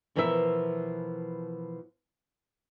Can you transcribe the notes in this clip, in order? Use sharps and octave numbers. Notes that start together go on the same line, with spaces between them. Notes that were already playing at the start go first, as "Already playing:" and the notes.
B2 E3 F3 A#4 B4 E5